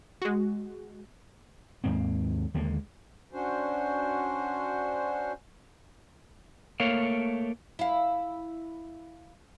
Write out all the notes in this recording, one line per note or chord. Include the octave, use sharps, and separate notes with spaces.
G#3 F#4
D#2 G#2 A#3 C4
D#2 D3 G#3 A#3
C#4 D4 F#4 C5
A3 A#3 A#4 C#5 F5
E4 F5